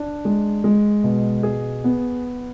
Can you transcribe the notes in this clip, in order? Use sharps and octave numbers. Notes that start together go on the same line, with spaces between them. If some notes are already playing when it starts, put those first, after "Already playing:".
Already playing: D4
G#3
G#3
B2
G#4
B3